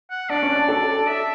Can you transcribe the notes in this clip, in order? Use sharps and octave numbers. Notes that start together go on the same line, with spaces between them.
F#5
D4 D5
C#4
D4
A4
E5